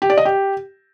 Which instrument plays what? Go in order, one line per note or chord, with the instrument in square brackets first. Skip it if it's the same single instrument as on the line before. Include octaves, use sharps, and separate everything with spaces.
[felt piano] G4
D5
D#5
G4